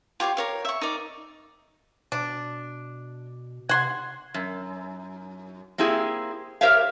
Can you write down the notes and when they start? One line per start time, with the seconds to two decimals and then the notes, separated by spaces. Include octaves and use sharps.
0.20 F4 G4 C#5 C6
0.37 A#4 C#5 F5
0.65 E5 C#6
0.81 D#4 A#4 D5
2.12 B2 D4
3.69 C3 F#5 C6 G#6
4.34 F#2
5.78 A#3 C4 E4 G4 G#4
6.61 G4 A#4 C5 C#5 E5 F5